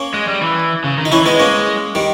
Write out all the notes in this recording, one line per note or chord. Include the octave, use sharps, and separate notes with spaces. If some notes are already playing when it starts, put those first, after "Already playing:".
Already playing: A#3 C#4
G#3
G3
E3
C#3
D#3
D#4
E3 C#4 E4
G#3 B3 D#4
A#3 C#4
D#3 G3